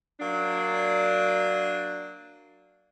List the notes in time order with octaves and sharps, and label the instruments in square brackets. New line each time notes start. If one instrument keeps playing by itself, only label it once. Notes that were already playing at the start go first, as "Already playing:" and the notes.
[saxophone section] F#3 A#3 D4